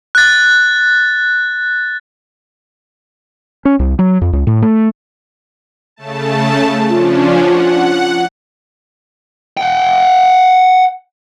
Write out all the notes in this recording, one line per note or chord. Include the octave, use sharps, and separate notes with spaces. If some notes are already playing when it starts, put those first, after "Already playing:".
F#6 A6
C#4
C2
F#3
F2
C#2
A2
A3
C#3 A3 A5
F3 C#4 D4 F4
F#5
F#5 G5